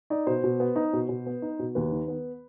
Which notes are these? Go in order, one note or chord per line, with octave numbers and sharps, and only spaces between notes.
D#4 D5
B2 C5
B2
B3
D#4
B2
B2
B3
D#4
B2
D#2 B4
D#3
B3